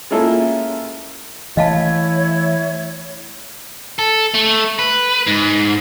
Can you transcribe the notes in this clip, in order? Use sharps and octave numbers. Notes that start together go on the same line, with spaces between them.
G#3 A#3 C#4 E4 F4 A4
E3 A3 E4 C#5 D#5 F5 A5
A4
A3
B4
G#2